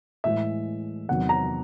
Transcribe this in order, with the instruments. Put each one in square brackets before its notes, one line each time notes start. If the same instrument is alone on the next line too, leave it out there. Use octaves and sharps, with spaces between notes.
[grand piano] A2 E3 G#3 E5
E2 C3 D#3 F#3 F#5
A#5